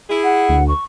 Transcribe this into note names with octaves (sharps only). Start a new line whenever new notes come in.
E4 G#4
F#5
D2
C#6